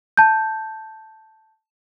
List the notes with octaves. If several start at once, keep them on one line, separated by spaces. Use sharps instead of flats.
A5 G6